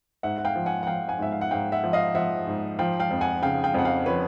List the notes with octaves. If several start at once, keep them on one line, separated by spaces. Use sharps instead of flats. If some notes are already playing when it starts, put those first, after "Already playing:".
G#2 E5 F#5
F#5
F5 G5
F3
F#5 G#5
F#5
F3 F5 G5
F#5 G#5
G#2 E5
F5
F#5
G#2 F5 G5
E5 F#5
F3
D#5 F5
F3 E5 F#5
G#2
F3 F5 G5
F5 G5
F2
F#5 G#5
C#3 F5 G5
F5 G5
F2 F#5
F5 G5
F3 B4 C#5